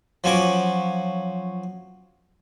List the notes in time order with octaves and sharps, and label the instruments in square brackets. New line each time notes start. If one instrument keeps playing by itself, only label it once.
[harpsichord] F3 F#3 C#4 D6